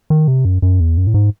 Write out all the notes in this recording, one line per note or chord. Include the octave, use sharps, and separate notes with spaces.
D#3
C3
F#2
F#2
E2
F#2
A2
G#2